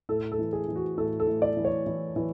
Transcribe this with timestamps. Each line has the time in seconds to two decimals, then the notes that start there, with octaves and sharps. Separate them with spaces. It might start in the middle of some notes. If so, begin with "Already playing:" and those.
0.09 A2 A4
0.32 A4
0.39 E3
0.53 G#4
0.68 E3
0.76 F#4
0.97 A2 A4
1.20 A4
1.27 A2
1.42 D5
1.57 E3
1.64 C#5
1.86 E3
2.16 E3